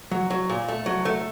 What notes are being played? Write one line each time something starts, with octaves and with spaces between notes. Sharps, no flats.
F#3
F#3
A#2
A3
F#3
A3